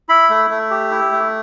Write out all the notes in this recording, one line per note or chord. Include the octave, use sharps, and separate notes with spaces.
E4 B5
A3
A3
G4
E4
A3